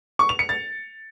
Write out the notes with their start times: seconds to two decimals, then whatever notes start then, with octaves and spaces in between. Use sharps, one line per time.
0.19 C#6
0.29 F7
0.39 C#7
0.49 A6